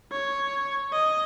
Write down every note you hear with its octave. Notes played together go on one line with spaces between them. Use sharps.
C#5
D#5